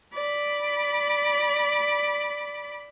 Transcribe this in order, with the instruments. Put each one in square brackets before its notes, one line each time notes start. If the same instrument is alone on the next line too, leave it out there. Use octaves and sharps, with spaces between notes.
[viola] D5 B5